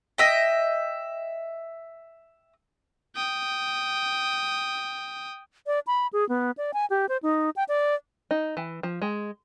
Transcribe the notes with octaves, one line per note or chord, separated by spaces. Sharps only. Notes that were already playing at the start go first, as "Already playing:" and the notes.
D#5 E5 G5
G5 D#6
D5
B5
G#4
B3
D5
G#5
G4
C5
D#4
G5
D5
D#4
E3
F3
G#3